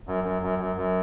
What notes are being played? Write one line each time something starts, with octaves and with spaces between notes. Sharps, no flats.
F#2
F#2
F#2
F#2
F#2